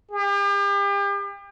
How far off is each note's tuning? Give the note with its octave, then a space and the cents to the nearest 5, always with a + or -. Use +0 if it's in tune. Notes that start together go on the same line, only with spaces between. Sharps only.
G4 +40